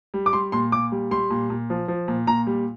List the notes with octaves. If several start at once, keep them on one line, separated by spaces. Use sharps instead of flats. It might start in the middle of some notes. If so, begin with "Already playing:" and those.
G3
D6
G3 C6
A#2 C6
A#2 D6
G3
G3 C6
A#2
A#2
F3
F3
A#2
A#2 A#5
G3